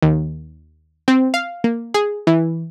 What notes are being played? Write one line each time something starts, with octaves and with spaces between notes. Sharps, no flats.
D#2
C4
F5
A#3
G#4
E3